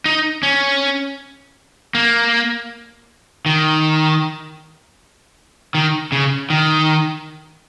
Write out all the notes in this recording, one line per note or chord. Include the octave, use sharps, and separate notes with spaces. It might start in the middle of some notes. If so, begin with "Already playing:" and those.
D#4
C#4
A#3
D#3
D#3
C#3
D#3